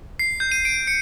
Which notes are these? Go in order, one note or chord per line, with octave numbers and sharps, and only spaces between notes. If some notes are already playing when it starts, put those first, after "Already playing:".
C7
G6
D#7
D7
C#7